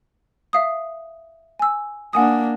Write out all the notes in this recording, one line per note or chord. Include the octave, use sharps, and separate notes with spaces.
E5 F5 D#6
G#5 E6
A#3 D4 F#5 G#5 D#6